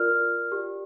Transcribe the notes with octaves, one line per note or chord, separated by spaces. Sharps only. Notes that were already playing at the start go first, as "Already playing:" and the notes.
Already playing: F4 A#4 D5 F6
G4 D5